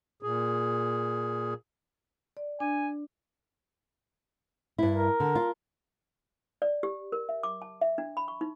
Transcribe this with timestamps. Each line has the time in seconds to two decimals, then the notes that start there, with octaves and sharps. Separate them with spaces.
0.23 A#2 G#4
2.37 D5
2.60 D4 G#5
4.78 G2 E4
4.92 A#4
5.20 D3
5.35 F4
6.62 D5
6.83 G4
7.12 A#4
7.29 E5
7.43 D6
7.62 A5
7.81 E5
7.98 D4
8.17 B5
8.28 C#6
8.41 D#4